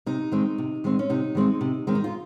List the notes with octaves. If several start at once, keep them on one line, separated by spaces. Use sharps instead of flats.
C3 D#4
D#3 G#3 C4
C3
D#3 G#3 C4
C#4
C3 D#4
D#3 G#3 C4
C3
D#3 G#3 C4
D#4
F4